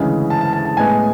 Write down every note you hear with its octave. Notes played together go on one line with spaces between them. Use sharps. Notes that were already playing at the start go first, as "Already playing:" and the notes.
Already playing: D2 C#3 E3 G#3
A5
A5
A5
A5
A2 G#3 B3 G#5